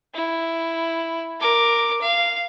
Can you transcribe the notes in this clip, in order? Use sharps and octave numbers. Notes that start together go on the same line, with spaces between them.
E4
A#4 D6
F5